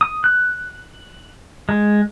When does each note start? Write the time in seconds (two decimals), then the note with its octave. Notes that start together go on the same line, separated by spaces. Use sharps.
0.01 D#6
0.24 F#6
1.69 G#3